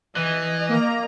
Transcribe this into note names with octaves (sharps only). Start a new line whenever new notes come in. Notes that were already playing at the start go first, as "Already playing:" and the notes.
E3 D#5
A#3 A#5